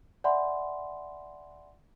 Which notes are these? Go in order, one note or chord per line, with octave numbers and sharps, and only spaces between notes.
D5 E5 F#5 G#5 B5 C6